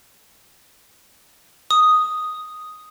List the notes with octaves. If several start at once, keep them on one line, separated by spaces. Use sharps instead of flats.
D#6